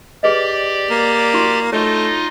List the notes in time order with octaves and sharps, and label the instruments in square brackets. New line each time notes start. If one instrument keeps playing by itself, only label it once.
[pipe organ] G4 D5 [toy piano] G#4 B4 D#5
[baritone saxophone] A#3
[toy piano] E4 F#4 C#6
[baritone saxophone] A3 [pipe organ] D#4 F4 D#5 [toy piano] C#5 C#6